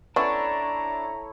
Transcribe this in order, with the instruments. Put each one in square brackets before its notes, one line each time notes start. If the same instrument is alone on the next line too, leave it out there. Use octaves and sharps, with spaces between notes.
[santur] A3 E4 C#5 [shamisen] B3 C#4 [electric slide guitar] D4 D5 [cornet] A#5